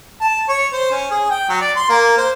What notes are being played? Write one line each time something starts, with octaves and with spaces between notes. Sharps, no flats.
A5
C#5
C5
C#4
G#4
G5
F#3
D5
C6
A#3
C5